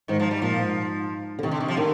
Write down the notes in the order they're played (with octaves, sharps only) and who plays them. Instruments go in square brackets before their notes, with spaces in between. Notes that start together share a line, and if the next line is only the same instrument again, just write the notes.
[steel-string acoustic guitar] G#2 [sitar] D#3
[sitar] F3
G3
[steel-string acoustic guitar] A#2 [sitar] F3
[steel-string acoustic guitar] G#2
D3
[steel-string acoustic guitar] C3 [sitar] D#3
[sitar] D3
D#3
F3
[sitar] D3 [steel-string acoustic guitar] D#3